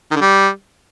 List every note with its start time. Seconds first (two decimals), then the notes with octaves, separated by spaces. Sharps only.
0.11 D#3
0.16 D3
0.21 G3